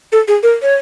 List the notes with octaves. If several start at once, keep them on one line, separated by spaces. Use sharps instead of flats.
A4
G#4
A#4
C#5